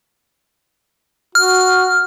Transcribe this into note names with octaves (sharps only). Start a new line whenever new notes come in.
F#4 F6